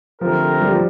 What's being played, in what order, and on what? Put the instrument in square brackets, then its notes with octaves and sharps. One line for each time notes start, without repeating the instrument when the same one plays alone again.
[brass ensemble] D3 A3 C4 G4 A#4 [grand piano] F3
[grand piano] G3
F3